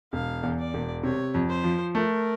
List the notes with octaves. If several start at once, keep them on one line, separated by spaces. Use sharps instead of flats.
E1 F5
E2
D5
E1
C3 C#5
F2
C5
F3
A3 A#4